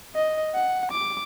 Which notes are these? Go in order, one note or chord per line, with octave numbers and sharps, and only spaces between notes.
D#5
F#5
D6